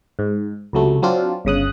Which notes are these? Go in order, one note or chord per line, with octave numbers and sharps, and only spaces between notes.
G#2
C#2 C3 F#3 A3
F#3 C4 D4 F4
G1 C#3 D#6 F#6